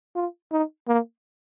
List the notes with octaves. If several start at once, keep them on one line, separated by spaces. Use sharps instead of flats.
F4
D#4
A#3